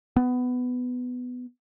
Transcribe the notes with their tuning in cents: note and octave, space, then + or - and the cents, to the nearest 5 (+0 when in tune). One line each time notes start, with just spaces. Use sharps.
B3 +10